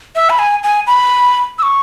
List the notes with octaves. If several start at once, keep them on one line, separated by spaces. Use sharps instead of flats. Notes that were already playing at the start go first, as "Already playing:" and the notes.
E5
B5
G#5
G#5
B5
E6
C#6